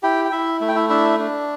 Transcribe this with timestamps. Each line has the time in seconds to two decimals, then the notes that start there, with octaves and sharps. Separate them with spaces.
0.03 E4 G4 G5
0.25 G5
0.32 E4 E5
0.61 A3 E5
0.68 G5
0.75 E4 E5
0.89 D4 E4 E5
1.19 D4